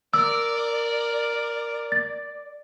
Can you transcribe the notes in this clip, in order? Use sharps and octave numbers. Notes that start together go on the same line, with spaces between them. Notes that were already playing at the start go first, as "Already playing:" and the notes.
A#4 D5 E6
A6